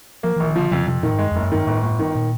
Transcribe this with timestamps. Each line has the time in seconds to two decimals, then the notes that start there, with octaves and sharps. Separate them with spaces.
0.23 F3 A#3
0.36 E3
0.40 A#1
0.48 D#3
0.56 D3 F3
0.71 F2 C#3
0.87 F2 C3
1.03 A#2 D#3
1.12 G#2
1.19 G2 G#3
1.31 F2
1.36 F#1
1.43 F#2
1.52 G2 D#3
1.67 G1 A2
1.83 G1
1.99 D#3
2.15 A#2